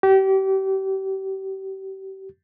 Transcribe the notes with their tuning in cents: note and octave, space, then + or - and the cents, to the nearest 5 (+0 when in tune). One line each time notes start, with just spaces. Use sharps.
G4 -30